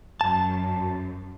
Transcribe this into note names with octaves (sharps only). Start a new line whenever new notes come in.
F#2 A5